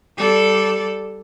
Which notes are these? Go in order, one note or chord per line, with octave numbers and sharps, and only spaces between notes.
G3 A4 D5